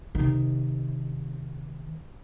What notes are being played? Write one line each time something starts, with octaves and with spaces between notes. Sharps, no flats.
C3 D#3